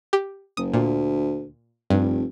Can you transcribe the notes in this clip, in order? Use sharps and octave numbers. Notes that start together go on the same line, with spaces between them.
G4
F#1 D#6
D2 A#2
F1 G2